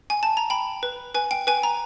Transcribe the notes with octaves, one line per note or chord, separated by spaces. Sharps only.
G#5
A5
A#5
G5 B5
B4
B4 G#5
G5
B4 G#5
A#5